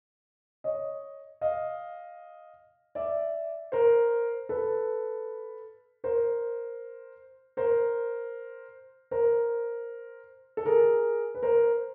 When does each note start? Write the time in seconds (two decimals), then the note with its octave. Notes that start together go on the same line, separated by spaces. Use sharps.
0.64 C#5 D#5
1.41 D#5 F5
2.95 D5 E5
3.72 A#4 C5
4.49 A4 B4
6.04 A#4 C5
7.57 A#4 C5
9.11 A#4 C5
10.57 A4
10.65 G#4 A#4
11.35 B4
11.43 A#4 C5